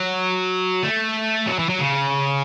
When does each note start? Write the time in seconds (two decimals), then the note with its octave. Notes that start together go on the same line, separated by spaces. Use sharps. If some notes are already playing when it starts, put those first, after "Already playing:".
Already playing: F#3
0.83 A3
1.47 F#3
1.59 E3
1.69 F#3
1.80 C#3